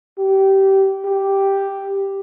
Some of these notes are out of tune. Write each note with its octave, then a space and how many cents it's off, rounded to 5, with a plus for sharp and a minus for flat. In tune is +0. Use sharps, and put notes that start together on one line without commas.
G4 -20
G4 +0